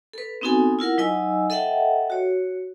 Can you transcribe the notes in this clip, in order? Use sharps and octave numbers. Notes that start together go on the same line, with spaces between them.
A4 B4
B3 C4 D#4 F#4 A4 G#5
E4 F4 A#4 F#5
F#3 D#4 D#5 G#5 E6
A4 D#5 E5 F#5 G5 A5
F#4 C#5